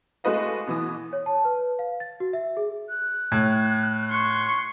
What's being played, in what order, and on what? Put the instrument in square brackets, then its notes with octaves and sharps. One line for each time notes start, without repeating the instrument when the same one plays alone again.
[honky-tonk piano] G#3 A3 F#4 B4 D#5 F5
B2 E3 D#6
[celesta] C#5
A5
B4
F5
A6
F#4
E5
G#4
[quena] F#6
[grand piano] A2
[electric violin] C6 C#6